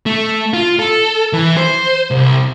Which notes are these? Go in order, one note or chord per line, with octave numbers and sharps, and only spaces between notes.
A3
F4
A4
E3
C5
C2